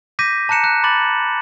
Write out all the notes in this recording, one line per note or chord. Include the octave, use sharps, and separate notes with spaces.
D6 G6 A#6 B6 D#7
A5 A#5 F#6 C#7 E7
F#6
B5 D6 A6 F#7